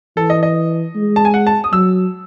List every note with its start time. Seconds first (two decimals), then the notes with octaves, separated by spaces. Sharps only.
0.17 E3 A4
0.30 D#5
0.43 D#5
0.95 G#3
1.16 A5
1.25 G#5
1.34 F#5
1.47 A5
1.64 D#6
1.73 F#3 E6